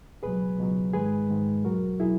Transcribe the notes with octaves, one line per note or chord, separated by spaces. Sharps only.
C#2 B2 F#3 G#4 B4
C#2 B2 F#3
G#2 D#3 G#3 G#4 B4
G#2 D#3 G#3
E2 B2 F#3 F#4 A#4
B2 F#3 E4 G#4